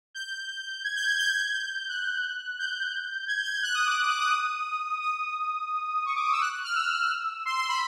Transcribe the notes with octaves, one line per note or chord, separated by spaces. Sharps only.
G6
G#6
G6
G#6
G6
G6
G6
G6
F#6
G6
G#6
G6
G#6
G6
F#6
D#6
D6
D#6
D6
D#6
D#6
C#6
D6
D#6
E6
F#6
F#6
F6
E6
C6
C6
B5